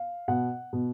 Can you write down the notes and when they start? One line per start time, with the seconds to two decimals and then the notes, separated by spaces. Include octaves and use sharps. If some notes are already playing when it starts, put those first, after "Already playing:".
Already playing: F5
0.28 B2 F#5
0.73 B2